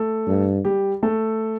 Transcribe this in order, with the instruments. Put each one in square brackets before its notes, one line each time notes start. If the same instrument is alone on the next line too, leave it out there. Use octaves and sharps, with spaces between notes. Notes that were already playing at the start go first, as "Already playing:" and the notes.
Already playing: [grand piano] A3 A4
[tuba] G2
[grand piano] G3 G4
A3 A4